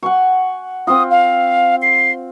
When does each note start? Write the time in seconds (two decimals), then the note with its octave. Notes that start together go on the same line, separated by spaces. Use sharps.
0.03 F#5 G#5 C#6
0.87 C4 F4 D#6
1.11 F5
1.82 C7